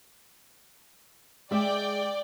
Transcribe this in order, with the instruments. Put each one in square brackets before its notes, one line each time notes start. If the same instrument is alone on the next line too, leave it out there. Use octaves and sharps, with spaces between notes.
[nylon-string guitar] G#3 E5 [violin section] D5 G5